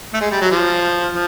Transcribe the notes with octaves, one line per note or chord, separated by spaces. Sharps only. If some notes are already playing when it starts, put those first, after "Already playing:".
A3
G#3
G3
F#3
F3
F3